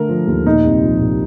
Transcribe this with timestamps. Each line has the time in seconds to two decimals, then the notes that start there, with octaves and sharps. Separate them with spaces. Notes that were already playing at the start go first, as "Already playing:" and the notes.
Already playing: D3 A3 A#4
0.09 F3
0.27 D#2
0.46 A#2 D#4
0.64 C2
0.83 F3
1.01 C2